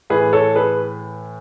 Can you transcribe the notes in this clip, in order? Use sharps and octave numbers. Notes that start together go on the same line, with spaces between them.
A2 E3 G#4 B4
A4 C#5
G#4 B4